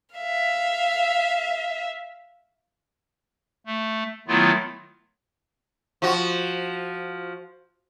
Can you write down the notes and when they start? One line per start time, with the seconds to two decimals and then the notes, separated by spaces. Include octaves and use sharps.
0.16 E5 F5
3.66 A3
4.28 D#3 F#3 A3 B3 E4 F4
6.02 F3 F#4